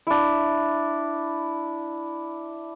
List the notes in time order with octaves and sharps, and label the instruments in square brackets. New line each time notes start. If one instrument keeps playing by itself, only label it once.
[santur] D4 E4